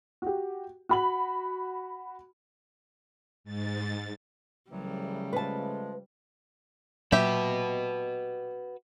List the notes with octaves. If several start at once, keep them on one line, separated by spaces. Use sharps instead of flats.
F#4 G4
F#4 B5 F#7
G#2 A6
C2 C#3 E3 F#3 G3 A3
F3 G#3 B4 A5
A#2 F#3 A#3 F#4 G4 B4 E5 G5